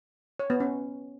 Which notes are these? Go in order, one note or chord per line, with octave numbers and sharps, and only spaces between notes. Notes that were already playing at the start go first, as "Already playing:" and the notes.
C#5
B3
C#4